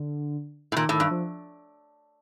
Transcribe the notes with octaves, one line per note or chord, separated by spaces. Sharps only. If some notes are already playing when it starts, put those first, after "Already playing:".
Already playing: D3
A2
A#2 D#3
A2 D#3
G2
F3